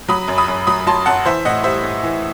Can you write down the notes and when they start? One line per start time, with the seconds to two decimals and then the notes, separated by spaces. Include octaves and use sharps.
0.09 F#3 B5 D#6
0.28 F#2
0.38 B5 D#6
0.48 F#2
0.67 F#3 B5 D#6
0.87 F#3 A5 C6
1.06 F#2 F#5 A5
1.26 E3 C5 E5
1.45 A2 D#5 F#5
1.64 G3 C5 E5
1.83 A2
2.03 E3